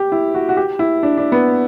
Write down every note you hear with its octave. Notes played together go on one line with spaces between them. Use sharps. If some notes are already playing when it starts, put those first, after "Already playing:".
Already playing: G4
E4
F#4
F#4
G4
E4
D4
D4
B3